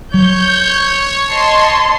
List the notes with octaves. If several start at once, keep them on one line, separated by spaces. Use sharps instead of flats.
F#3 C#5 G6
D#5 A5 C6